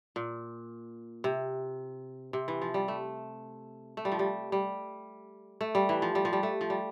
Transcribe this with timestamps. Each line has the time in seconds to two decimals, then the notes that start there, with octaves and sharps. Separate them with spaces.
0.16 A#2
1.24 C3
2.33 C3
2.48 E3
2.62 F3
2.74 G3
2.88 A3
3.97 A3
4.05 G3
4.12 F3
4.19 G3
4.52 G3
5.61 A3
5.75 G3
5.89 E3
6.02 F3
6.15 G3
6.25 F3
6.33 G3
6.43 A3
6.61 F3
6.70 G3